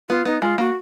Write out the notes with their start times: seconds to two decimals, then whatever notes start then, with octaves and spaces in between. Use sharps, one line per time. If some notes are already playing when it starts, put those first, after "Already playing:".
0.09 B3 F4
0.25 B3 D#4
0.42 G#3 F4
0.58 A#3 F#4